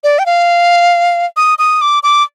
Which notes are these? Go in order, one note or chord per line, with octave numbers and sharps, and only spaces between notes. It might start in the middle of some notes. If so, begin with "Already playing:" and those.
D5
G5
F5
D#6
D#6
D6
D6